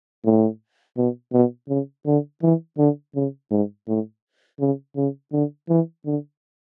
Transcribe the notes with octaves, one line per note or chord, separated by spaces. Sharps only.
A2
B2
B2
C#3
D3
E3
D3
C#3
G#2
A2
C#3
C#3
D3
E3
D3